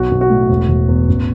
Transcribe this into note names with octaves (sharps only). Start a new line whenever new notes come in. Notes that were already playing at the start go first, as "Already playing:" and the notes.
Already playing: B1 F#4
B1
F#4
A2
E1
E1
E2
A1